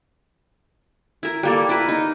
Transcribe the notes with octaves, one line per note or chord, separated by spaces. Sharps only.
E4 A#4
G3 A#3 A4
E4 A#4 B4
D#4